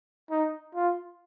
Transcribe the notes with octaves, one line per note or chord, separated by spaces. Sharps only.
D#4
F4